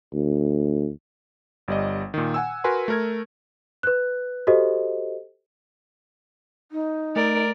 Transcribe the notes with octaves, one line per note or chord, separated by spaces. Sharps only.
D2
G1 G3 D5 D#5
A#2 D#3
F#5 G#5 E6
F#4 A#4 B4 G#5 C6
A3 A#4 G#6
B4 F#6
F#4 G4 A4 C5 D#5
D#4
A3 A#4 D5